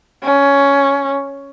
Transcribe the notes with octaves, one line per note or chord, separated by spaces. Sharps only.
C#4